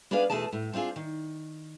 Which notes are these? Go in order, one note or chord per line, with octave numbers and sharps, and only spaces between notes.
B3 D4 G#4 D5 F5
E2 B2 A3 G#4 A5
A2
C4 D4 F4 G#4
D#3